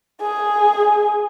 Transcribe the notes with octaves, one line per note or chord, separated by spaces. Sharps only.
G#4